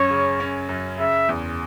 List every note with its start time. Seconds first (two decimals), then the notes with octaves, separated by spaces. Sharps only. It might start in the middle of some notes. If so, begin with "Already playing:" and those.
Already playing: F#2 C#4 C#5
0.10 C#3
0.40 C#4
0.69 F#2
0.99 C#3 E5
1.29 E2